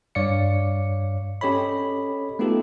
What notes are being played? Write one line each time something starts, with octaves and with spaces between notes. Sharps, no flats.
G2 C#5 D5 F5 C#7
C#4 G4 A4 C#5 D#5 B5
A3 B3 D#4 F4 G4 A4